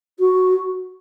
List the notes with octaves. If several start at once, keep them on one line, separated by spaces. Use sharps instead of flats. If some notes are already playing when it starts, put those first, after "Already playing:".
F#4